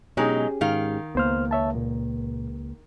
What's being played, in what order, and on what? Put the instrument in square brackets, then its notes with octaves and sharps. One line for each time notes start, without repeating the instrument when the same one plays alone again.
[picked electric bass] B2 [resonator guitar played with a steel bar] F#3 G#3 D#4 [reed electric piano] C#4 G4 G#4
[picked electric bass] G#2 [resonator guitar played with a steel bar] D#3 F5
[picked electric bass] C#2 A#3 [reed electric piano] B3 C5 F6
[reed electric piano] C#5 E5 A5
A#2